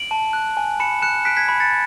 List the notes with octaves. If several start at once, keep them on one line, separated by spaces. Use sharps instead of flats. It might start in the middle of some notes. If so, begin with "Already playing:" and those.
Already playing: D7 F#7
A5
F#6
G#5
B5 C#7 E7
F#6 C#7 E7
C#7
F#6 B6 D7
G#6 B6
B5
A6 C#7